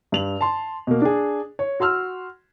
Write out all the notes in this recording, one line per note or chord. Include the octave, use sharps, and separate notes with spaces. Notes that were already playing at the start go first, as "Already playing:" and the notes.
G2 F7 F#7
A5 C6
B2 A#3
D4 G#4
C#5
F#4 C6 E6 F6